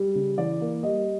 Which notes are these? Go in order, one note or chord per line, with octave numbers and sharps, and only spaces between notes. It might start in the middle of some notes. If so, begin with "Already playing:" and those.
Already playing: G3
C#3
E3 D5
A#3
G3 D#5